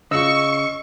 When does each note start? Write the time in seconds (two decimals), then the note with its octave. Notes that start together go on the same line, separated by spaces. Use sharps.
0.11 C#3 F4 D#5 C#6 E6